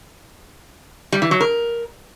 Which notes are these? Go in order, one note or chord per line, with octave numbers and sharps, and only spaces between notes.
G3
E3
F#3
A#4